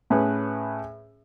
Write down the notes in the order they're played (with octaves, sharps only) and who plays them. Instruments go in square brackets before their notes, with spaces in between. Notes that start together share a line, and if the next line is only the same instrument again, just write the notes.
[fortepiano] A2 C#4 G#4 B4